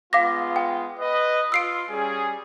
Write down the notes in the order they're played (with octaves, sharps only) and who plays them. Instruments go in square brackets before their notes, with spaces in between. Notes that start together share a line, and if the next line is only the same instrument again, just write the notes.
[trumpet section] G#3 B3 F4 [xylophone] F5 D6 A#6
[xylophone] G5
[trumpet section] B4 D#5
[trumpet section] F4 [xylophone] E6 C7 D7
[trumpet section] G3 C#4 G#4